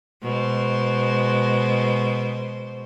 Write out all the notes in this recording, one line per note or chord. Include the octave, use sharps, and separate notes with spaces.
B2 G#3 C5